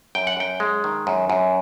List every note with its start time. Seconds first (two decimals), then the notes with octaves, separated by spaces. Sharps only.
0.15 F#2 G5
0.27 F#5
0.37 F#2 G5
0.60 G#3
0.84 D#3
1.07 F#2
1.30 F#2